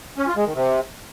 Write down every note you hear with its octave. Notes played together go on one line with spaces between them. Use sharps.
C#4
F4
G#3
D#3
C3